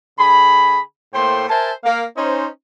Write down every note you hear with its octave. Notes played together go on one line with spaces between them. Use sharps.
D3 G#4 G#5 B5
A2 A3 A#3 C5 G5 C6
A#4 C5 E5 G#5 A5
A#3 F5
C#4 D#4 C5